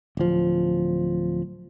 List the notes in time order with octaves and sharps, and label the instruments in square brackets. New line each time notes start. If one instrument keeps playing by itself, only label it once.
[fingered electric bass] D1 F3